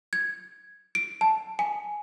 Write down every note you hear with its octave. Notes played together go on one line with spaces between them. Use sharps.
G#6
D7
A5
G#5